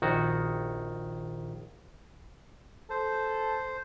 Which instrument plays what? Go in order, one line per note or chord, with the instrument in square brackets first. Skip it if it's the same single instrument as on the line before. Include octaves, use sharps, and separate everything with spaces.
[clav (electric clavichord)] A#1 D#3 F#4
[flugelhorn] A4 [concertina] C5